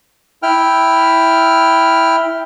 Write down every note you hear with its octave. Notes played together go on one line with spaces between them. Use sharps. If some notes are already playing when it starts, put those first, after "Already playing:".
E4 G5 F6